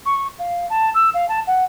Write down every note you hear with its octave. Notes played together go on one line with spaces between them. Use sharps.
C#6
F5
A5
E6
F5
A5
F#5